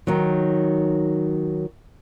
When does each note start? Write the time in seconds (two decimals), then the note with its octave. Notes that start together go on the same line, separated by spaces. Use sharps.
0.07 D#3 F#3